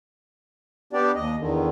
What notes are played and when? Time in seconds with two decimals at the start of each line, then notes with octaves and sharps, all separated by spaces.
0.93 B3 D4 G4 D5
1.15 D#2 D#5
1.39 E2 D3 D#3